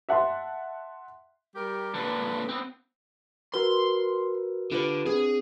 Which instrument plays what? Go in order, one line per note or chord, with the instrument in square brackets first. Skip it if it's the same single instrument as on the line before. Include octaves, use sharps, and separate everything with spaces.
[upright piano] E5 F#5 A5 C6
[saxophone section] G3 G4 A#4
[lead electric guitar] A#2 D3 [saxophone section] D4 B4
[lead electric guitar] B3 C4
[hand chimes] F#4 A#4 B4 [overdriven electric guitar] C6
[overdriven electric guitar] D3 [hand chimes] F4 G4 B4
[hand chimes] C4 D4 [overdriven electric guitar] G#4